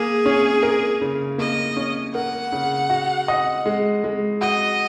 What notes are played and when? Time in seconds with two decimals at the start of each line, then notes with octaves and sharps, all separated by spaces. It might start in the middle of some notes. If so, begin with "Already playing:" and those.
Already playing: A#3 G#4
0.26 C#4
0.63 A#4
1.01 C#3
1.38 A#3 D#5
1.77 C#4
2.14 A#4 F#5
2.52 C#3
2.90 F#4
3.28 D#5
3.66 G#3
4.04 G#3
4.41 F#4 D#5